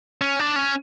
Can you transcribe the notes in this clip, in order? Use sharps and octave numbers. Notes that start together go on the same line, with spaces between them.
C#4
D4
C#4